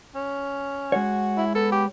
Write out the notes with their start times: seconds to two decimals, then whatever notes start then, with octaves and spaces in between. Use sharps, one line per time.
0.15 C#4
0.92 G#3 F#4 C#5 F#5
1.37 E4
1.55 B3 A4 B4
1.72 G4